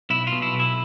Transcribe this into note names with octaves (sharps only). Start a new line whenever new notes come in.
B1 E4
F4
B2
E4
B1
E4